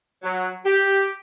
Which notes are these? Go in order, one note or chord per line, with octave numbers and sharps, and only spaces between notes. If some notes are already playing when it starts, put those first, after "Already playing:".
F#3
G4